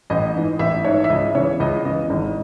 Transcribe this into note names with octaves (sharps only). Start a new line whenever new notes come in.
A1 D#5
G#2 E3
A1 E5
G#2 E3 C#5
E5
C#2 D#5
C#3 E3 C#5
C#2 D#5
C#3 E3 D#5
G#1